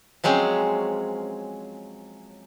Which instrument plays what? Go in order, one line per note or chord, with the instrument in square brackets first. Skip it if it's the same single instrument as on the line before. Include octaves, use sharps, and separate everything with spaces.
[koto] F3 F#3 G#3 C4 C#4